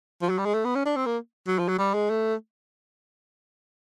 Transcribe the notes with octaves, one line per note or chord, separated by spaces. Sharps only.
F3
F#3
G3
G#3
A3
B3
C#4
D4
C4
A#3
F#3
F3
F#3
G3
G#3
A3